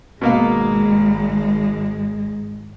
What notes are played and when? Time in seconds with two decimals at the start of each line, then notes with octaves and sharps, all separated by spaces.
0.21 G#1 G#2 B2 G#3 A#3 F5